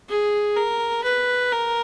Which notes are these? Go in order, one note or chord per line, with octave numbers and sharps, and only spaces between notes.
G#4
A#4
B4
A#4